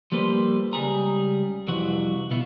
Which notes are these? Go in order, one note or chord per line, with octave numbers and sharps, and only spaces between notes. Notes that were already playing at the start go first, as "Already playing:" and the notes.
F3 G3 A#3 A4 B4 C5
C#2 G3 G#4 A#5
C2 F2 C3 E3 F#4 B4
B2 B3 E4 F4